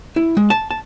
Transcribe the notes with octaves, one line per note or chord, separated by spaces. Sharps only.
E4
G#3
A5
A5